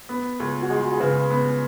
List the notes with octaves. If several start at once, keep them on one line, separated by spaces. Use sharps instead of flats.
B3
C#2
F#4
G#3 G#4
F#4
G#4
C#3 B4
B3